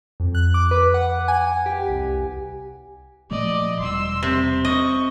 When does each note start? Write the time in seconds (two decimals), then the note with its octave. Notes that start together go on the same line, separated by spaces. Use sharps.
0.20 F2
0.35 F#6
0.54 D6
0.71 B4
0.94 F#5
1.28 G#5
1.66 G4
1.89 C2
3.31 A#2 F3 A3 D5 D#5
3.79 E1 G3 C6 E6
4.23 C3
4.65 D#5 C#6